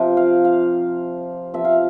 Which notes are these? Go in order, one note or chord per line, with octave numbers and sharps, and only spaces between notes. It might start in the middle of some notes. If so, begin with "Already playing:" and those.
Already playing: C3 F3
F5
F5
C3 F3 E5
F5